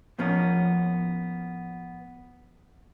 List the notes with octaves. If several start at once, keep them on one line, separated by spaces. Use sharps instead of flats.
A2 F3 A#3 B3 C#4